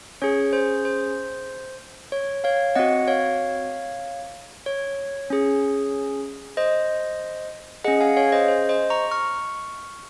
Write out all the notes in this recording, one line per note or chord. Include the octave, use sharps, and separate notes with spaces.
C#4 G#4 C#5
C5
C5
C#5
C#5 F5
C4 F#4 D#5 F#5
C#5 F5
C#5
C#4 G#4
C5 D#5
C#4 G#4 D#5 F#5
F5 G#5
C#5 F5
C5 D#5
C5
C5 D#5
A#5 C#6
C#6 F6